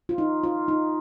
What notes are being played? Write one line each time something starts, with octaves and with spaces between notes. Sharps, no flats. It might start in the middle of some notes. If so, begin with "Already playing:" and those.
F4
D#4
F4
D#4